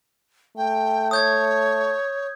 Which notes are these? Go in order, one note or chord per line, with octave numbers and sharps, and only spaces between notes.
A3 G5
C#5 D#6 G6 G#6